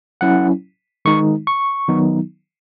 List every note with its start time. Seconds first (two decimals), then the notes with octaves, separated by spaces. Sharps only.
0.21 F#3 C#4 E4 F#5
1.05 D#3 G#3 D#4 C#6
1.47 C#6
1.88 D#3 F#3 B3 D#4